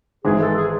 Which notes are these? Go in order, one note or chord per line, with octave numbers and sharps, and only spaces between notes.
G#1 G#2 E3 G#3 G#4
A4
G#4